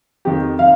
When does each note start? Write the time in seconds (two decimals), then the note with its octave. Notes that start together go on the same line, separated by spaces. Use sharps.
0.25 F2 D#3 G4
0.59 D#3 F5